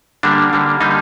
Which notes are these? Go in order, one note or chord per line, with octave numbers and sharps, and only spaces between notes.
D3 G3 A#3 D4
D3 G3 A#3
D3 G3 A#3 D#4